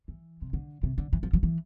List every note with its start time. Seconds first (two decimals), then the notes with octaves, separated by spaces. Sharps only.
0.08 E3
0.42 C3
0.53 D3
0.83 C3
0.98 D3
1.13 E3
1.23 F3
1.33 F3
1.43 E3